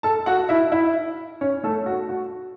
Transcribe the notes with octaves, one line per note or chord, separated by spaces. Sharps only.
A4 A5
F#4 F#5
E4 E5
E4 E5
C#4 C#5
A3 A4
F#4
F#4